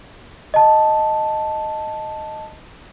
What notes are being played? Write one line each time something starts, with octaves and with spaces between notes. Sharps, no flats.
D#5 A5